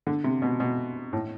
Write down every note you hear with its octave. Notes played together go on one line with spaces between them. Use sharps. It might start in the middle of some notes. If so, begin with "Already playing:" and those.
D3
C3
B2
B2
A2